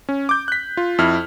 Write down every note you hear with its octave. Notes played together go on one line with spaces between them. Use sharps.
C#4
D6 G6
F#6 B6
F4
F2 E4 F6